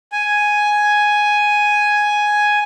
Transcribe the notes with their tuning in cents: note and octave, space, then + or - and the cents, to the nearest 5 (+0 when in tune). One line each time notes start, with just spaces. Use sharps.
G#5 +5